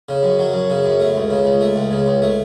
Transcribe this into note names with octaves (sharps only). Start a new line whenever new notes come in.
C#3
F#2
F#3
F#2
C#3
F#2
A3
C#2
C#3
C#2
A3
C#2
C#3
C#2
A3